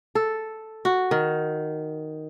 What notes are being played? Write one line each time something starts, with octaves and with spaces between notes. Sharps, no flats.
A4
F#4
D#3